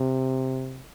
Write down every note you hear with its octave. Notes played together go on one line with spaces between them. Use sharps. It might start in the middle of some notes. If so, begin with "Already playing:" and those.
Already playing: C3